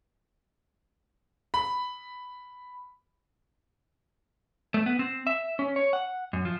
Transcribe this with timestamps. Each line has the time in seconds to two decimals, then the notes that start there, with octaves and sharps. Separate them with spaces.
1.54 B5
4.74 A3
4.86 B3
4.99 C4
5.27 E5
5.59 C#4
5.76 C#5
5.93 F#5
6.33 F#2
6.45 F3